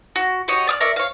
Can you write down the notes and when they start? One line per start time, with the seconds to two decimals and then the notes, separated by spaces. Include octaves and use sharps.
0.16 F#4
0.48 F#4 G4 C#5 D#5
0.67 D5 D#6 F6
0.80 A#4 C#5 D5 E5
0.96 C#5 F5